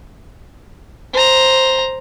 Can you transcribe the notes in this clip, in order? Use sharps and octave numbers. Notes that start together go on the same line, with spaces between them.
C5 A#5